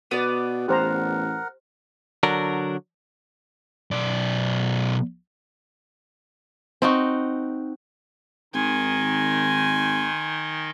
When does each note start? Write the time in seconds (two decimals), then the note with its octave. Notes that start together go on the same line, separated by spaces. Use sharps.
0.11 B2 B3 D5
0.68 A1 G4 A#4 C5 F#5 A#5
2.23 D3 F#3 D4 A#4
3.91 B1 D5
6.82 C4 D#4 F#4
8.54 G#1 D#3 D#4 G#5 C6